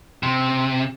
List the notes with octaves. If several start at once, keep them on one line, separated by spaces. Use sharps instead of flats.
C3